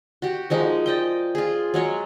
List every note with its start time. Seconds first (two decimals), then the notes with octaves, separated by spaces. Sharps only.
0.22 F#4 G4
0.50 F3 G#3 D#4 A#4
0.86 D5 D#5 G5
1.35 F4 G#4
1.74 F#3 G#3 C#5